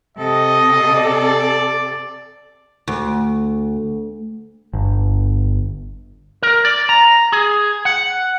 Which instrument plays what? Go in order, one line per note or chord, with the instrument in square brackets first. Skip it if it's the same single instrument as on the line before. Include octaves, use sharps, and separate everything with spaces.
[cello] C3 A4 [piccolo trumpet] D#5
[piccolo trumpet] D5
[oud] D2
[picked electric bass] G1
[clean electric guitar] A#4
D5
A#5
G#4
F#5